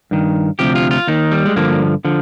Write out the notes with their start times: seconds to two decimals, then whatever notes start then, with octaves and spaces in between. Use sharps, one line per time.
0.11 G2 D#3
0.59 D2 C3 F3 G4
0.75 F4
0.91 F4
1.07 D#2 D#3 D#4
1.31 G3
1.46 G#3
1.56 G2 D3 F3 A#3
2.05 D3 F3